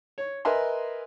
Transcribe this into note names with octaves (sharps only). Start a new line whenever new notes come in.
C#5
A#4 B4 D#5 E5 G#5 C6